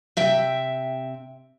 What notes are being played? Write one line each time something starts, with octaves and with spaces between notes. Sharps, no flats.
C3 E5 G5